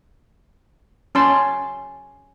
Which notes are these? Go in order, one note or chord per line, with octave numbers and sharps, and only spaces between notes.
C#4 A5 C6